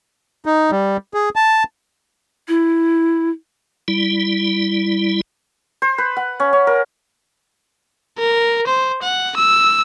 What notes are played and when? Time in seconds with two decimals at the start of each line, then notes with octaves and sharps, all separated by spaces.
0.46 D#4
0.71 G3
1.14 G#4
1.36 A5
2.48 E4
3.88 G3 E4
5.82 C5
5.98 B4
6.17 F#5
6.40 C#4
6.53 C#4
6.67 A#4
8.19 A#4
8.67 C5
9.03 F#5
9.37 E6